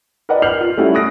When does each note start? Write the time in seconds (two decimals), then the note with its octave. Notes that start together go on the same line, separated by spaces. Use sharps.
0.29 A#4 B4 D5 D#5 F#5
0.42 F6 G6 C7 F7 F#7
0.61 F4
0.77 G3 A3 C#4 E4 F#4
0.95 D#6 F#6 A#6 D7